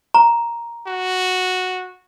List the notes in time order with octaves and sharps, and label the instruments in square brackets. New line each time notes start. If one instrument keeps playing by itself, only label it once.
[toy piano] A#5
[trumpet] F#4